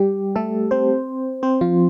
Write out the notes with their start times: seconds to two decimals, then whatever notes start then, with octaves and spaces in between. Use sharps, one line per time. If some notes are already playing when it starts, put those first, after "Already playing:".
Already playing: G3 G4
0.36 A3 A4
0.71 C4 C5
1.43 C4 C5
1.61 F3 F4